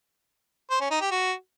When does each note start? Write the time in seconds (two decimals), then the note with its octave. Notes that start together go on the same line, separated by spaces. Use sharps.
0.71 C5
0.81 C#4
0.91 D#4
1.01 G4
1.11 F#4